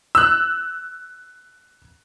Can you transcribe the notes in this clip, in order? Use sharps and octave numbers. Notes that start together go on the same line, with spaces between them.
E6 F#6